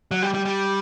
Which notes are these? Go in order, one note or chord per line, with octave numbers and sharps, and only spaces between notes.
F#3
G3
G3
G3